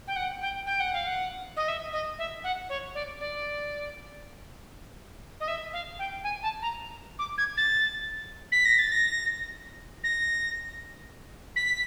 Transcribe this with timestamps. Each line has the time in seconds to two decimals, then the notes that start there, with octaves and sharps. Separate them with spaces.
0.08 G5
0.16 F#5
0.42 G5
0.66 G5
0.80 F#5
0.93 F5
1.07 F#5
1.56 D#5
1.68 E5
1.93 D#5
2.19 E5
2.44 F#5
2.69 C#5
2.95 D5
3.20 D5
5.40 D#5
5.48 E5
5.73 F5
5.99 G5
6.24 G#5
6.43 A5
6.62 A#5
7.19 D6
7.38 G#6
7.57 A6
8.52 B6
8.65 A#6
8.79 A6
8.92 A#6
10.04 A#6
11.56 B6